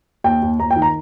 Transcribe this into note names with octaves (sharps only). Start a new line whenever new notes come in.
D#2 G5
D#2
D#2 A#5
G5
D#3
A#5